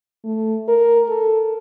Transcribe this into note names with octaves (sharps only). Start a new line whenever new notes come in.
A3
A#4
A4